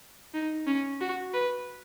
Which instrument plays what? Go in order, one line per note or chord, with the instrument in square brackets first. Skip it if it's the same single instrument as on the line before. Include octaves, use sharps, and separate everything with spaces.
[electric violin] D#4
C#4
F#4
B4